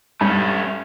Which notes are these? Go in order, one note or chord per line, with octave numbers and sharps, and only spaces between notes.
G2 A3 C#4